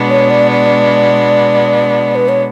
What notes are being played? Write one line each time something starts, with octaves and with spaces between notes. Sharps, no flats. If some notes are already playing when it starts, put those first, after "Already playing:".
Already playing: B2 G#3 B3 D4
C#5
D5
D5
B4
C#5